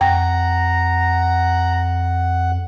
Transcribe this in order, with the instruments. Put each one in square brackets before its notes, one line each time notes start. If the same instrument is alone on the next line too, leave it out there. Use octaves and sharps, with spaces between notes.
[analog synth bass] F2 [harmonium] F#5 [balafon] G5 [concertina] A#5